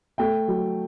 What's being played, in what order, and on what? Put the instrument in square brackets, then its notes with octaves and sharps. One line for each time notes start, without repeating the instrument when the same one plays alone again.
[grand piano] A3 G5
F#3